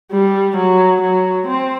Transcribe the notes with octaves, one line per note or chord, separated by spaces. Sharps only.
G3
F#3
F#3
C4